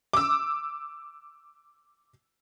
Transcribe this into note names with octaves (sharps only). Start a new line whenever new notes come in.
D6 E6